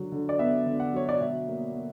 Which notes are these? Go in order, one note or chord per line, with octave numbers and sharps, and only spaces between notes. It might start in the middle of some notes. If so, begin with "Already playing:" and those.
Already playing: D3 F#3
D3
D5
B3 E5
D3
F#5
F#3 C#5
D5
B2 E5
A#3
A#3